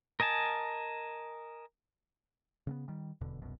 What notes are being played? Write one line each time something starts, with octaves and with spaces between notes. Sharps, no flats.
A#4 D#5 G#5 A5
C#3 A#3 B3
D#3 G3
D#1 E2 B2 D3
F1 C2 F#2 B2